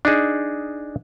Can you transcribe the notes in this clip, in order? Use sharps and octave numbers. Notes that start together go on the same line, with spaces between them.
D4 D#4 G#4